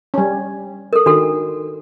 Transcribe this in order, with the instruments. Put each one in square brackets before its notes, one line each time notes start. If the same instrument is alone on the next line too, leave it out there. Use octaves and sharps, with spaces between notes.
[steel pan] G3 C#4
[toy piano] A4 A#4
[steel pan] D#3 [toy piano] D4 F#4 A4